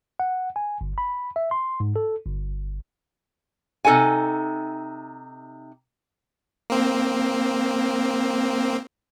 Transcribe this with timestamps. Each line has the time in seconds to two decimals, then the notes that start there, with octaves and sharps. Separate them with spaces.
0.20 F#5
0.56 G#5
0.81 G1
0.98 B5
1.36 E5
1.51 C6
1.80 G#2
1.96 A4
2.25 G1
3.85 C3 D#4 A4 F#5 G#5
6.70 A#3 C4